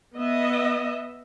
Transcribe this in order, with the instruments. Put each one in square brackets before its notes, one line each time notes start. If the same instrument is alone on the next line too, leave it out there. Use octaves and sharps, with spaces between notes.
[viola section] B3 D#5 E5